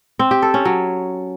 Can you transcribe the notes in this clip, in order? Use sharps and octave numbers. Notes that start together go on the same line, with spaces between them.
C4
G4
A4
C#4
F#3